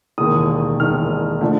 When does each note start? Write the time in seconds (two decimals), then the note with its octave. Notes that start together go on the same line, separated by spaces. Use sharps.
0.18 E1 D#2 D#3 D#6
0.80 E1 D#2 D#3 F6
1.41 D3 F3 A3